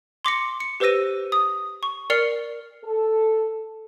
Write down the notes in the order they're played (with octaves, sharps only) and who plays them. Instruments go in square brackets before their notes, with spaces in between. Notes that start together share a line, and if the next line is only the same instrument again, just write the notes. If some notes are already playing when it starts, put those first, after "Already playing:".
[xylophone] C6 D6 A#6 C#7
C#7
G4 B4 C5 E6 A#6 D#7
D#6
C#6
A#4 D5 F6 C7 C#7 F7
[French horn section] A4